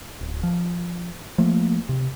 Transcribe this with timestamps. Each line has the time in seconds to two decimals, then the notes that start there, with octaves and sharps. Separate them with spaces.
0.21 D1
0.43 F3
1.38 F3 A3 A#3
1.89 C3